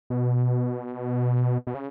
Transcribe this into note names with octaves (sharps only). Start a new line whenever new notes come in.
B2
B2
C#3